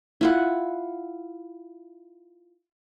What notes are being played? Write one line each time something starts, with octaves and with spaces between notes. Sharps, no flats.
E4 F4 F#5